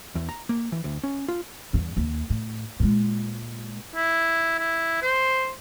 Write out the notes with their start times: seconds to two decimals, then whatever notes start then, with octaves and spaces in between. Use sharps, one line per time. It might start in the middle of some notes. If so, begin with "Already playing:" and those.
0.15 E2
0.29 A#5
0.49 A#3
0.72 E3
0.84 D2
1.03 C#4
1.28 F4
1.73 E2 G2
1.97 D#2
2.30 A2
2.80 A#2 G#3
3.95 E4
4.59 E4
5.02 C5